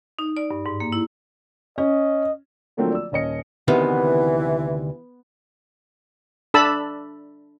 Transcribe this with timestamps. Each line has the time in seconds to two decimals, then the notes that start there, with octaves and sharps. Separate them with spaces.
0.19 D#4
0.37 D5
0.51 G2
0.66 G#2
0.80 A#3
0.92 E4
1.78 C#4 D#5
2.77 D3 F3 F#3 A3 A#3 C4
2.91 D5 E6
3.12 D#1 C#4 D#5 C#7
3.68 D2 C3 D#3 E3 B3
6.54 D4 A4 A5 B5 E6